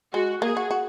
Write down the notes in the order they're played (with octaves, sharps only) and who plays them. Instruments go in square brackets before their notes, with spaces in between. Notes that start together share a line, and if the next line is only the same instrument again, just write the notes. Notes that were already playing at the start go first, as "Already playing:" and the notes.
[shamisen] G#3 [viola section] F#4
[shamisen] A#3 [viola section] G#4
[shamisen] F#4
F#4